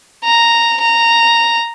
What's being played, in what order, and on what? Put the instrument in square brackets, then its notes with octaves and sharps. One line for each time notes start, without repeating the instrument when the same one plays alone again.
[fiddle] A#5
A#5